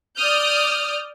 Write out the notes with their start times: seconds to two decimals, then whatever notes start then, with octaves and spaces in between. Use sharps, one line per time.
0.17 D5 D#6 F6 G6